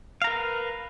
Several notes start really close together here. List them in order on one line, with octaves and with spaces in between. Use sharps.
F5 A#5 A#4 B4